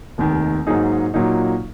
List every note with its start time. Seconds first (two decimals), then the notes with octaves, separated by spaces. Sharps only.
0.18 F1 D#2 D#3
0.67 G#2 F#3 A#3 D#4 G#4
1.14 A#2 F#3 A#3 D#4